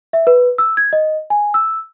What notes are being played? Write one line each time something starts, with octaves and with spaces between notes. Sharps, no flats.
E5
B4
E6
G#6
D#5
G#5
E6